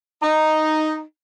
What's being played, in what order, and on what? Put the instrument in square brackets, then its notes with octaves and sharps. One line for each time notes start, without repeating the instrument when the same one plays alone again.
[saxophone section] D#4